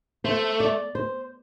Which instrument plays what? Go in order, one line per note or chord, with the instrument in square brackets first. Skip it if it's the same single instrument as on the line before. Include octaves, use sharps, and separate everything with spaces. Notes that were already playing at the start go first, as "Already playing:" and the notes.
[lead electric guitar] A3 [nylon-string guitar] C5
[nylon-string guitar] D5
C5